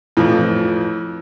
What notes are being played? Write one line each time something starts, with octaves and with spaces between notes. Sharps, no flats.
F2 A2 E3 F3